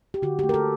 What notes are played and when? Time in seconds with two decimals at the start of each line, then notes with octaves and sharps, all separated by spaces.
0.14 G4
0.22 D3 F#4
0.39 A3 G4
0.49 A#4
0.54 A4